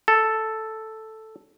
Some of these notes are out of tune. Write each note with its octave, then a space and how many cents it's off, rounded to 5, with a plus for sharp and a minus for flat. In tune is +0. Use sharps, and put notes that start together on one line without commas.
A4 +0